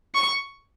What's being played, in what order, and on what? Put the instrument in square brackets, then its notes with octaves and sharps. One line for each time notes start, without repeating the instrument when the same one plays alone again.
[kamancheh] C#6